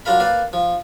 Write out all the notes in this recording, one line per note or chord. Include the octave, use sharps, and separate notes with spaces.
F#3 D4 F4 A#4 F5 B5
A#3 B4 D5 F5
F3